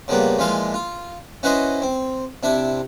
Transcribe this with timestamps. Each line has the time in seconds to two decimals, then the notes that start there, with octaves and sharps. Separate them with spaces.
0.08 C#3 F3 G3 A#3 B3
0.38 A#2 E3 F3 G#3 F5
0.74 F4
1.43 C#4 E4 F#4 B4 C5 D#5
1.82 C4
2.43 C3 D4 E4 E5